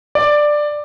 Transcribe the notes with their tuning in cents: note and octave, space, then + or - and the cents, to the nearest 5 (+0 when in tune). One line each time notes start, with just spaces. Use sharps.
D5 +10